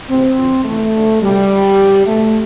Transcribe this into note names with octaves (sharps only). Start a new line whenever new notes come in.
D2 C3 E3 C4
F2 D3 F3
E2 C3 E3 A3
D2 D3 F3
C2 B2 G3
G2 D3 F3
G2 F3
C2 B2 A3